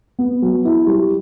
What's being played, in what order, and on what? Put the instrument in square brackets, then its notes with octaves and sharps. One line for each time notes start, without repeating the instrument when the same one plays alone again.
[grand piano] B3
F#3
E4
G3